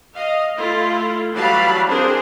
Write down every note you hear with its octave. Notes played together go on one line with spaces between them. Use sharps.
D#5 F5
A3 E4 F4
E3 F#3 G3 F5 A5 B5
C4 D4 G#4 A#4 C5